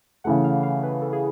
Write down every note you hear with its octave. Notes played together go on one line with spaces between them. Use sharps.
C#3 E3 A3 F#5
F5
F5
B4
A4
G#4